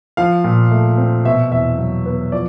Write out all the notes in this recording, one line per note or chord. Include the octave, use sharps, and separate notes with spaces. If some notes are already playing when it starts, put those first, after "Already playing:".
F3 F5
A#2
A3
C4
B2 E5
E2 E5
F#3
B3
F3 D5